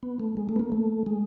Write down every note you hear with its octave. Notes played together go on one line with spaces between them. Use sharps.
B3
A3
G#3
A3
B3
A#3
A3
G#3